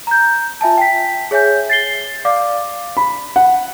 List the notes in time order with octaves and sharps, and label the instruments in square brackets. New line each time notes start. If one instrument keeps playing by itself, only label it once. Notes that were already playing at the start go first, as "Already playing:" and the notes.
[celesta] A#5 G6
F4 E5 G#5 A5
G5 B6
G#4 C#5 E5 G#5 G6
A6 C7 G7
D5 F5 D6
[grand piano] B5
F#5